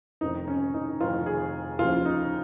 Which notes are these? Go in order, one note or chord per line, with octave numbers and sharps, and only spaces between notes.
F1 F2 D#3 D#4
C#4
D#4
F1 F2 D#3 F4
G#4
D#2 C#3 F3 F4
D#4